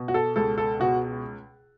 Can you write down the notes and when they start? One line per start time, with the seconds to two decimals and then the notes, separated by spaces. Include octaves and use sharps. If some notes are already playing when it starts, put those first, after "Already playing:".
Already playing: B2
0.08 F#4
0.14 A4
0.36 C#2 A4
0.58 A4
0.80 B2 F#4